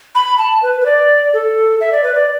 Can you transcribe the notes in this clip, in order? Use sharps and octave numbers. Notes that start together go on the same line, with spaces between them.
B5
A5
B4
B4
D5
A4
E5
D5
B4
D5